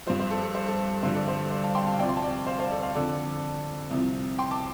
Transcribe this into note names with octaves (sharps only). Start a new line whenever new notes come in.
G2 F3 C5
C5
A4
A4
C5
A4
G2 D3 F3 C5
A4 D5
C5
C5
F5 A5
G5 C6
F5 A5
D2 C3 F3 D5 G5
C6
A5
D5 G5
C5 F5
C5 F5
A4 D5
C5 F5
F2 D3 F3 A4 D5
C2 C3 F3
G5 C6
A5 D6